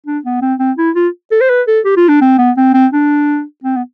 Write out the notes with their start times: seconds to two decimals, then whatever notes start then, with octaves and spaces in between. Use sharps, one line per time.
0.07 D4
0.25 B3
0.42 C4
0.60 C4
0.78 E4
0.96 F4
1.32 A4
1.41 C5
1.50 B4
1.68 A4
1.85 G4
1.97 F4
2.09 D4
2.22 C4
2.39 B3
2.57 C4
2.74 C4
2.93 D4
3.64 C4
3.77 B3